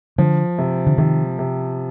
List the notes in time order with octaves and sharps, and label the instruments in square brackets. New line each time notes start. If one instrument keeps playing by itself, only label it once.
[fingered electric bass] D3 [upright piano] F3
[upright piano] C3
[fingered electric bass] D3
[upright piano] C3 [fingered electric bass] D#3
[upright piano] C3